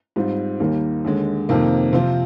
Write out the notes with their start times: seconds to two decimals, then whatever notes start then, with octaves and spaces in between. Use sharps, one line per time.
0.16 G#2 G3 C4 F4
0.60 D#2 D#3 G3 A#3
1.05 D#2 D3 G#3
1.49 F2 C3 D#3 A#3
1.93 C3 F3 C4 F4